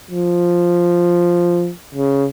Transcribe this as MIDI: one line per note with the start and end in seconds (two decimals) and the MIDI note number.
0.11 1.72 53
1.95 2.26 49